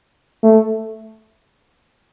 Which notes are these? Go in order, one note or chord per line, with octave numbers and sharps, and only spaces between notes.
A3